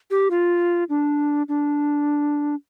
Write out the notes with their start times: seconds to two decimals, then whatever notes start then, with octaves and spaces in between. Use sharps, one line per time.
0.11 G4
0.31 F4
0.89 D4
1.48 D4